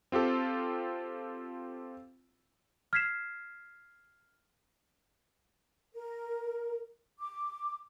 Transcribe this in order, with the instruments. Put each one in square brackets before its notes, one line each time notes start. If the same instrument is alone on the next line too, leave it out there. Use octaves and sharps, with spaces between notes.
[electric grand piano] C4 F4 G4 A4
[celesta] F6 G#6 B6 C7 E7
[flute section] A#4
D6